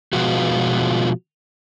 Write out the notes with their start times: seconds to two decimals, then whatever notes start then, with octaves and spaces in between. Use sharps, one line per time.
0.13 B2 F3 G#3 B3 F4 F#4